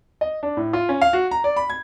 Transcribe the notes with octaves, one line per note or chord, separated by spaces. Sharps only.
D#5
D4
A2
F4
C#4
F5
F#4
A#5
D5
B5
G#6